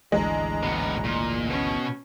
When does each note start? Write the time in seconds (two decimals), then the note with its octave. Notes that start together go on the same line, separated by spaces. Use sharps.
0.12 G#1 D2 E3 G#3 D4 A#5
0.63 A2 B3
1.04 A#2
1.49 B2 C#4 C#6